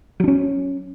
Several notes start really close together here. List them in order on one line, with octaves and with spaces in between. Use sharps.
F#3 D4 C#4